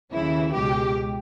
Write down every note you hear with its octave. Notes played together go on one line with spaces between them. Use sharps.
D#2 C#3 E3 E4
C#2 B2 G#3 G4